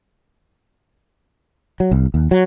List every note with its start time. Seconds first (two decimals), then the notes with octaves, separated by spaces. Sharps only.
1.80 F#3
1.91 C2
2.14 D#2
2.31 F#3